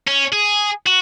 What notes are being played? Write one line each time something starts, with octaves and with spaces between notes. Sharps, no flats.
C#4
G#4
F#4